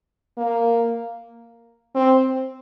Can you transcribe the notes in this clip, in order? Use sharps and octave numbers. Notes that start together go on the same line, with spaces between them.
A#3
C4